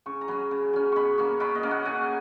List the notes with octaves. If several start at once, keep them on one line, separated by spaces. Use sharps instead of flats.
C#3 C#6
A#5
F#3 C#4 B5
C#3
F#3 C#4
B2 B5 C#6
A#3 C#4 C#6
B2 B5
D#5
A#3 C#4
F#5
C#3 G#5